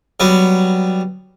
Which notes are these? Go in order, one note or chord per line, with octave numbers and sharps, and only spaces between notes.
F#3 G3 B3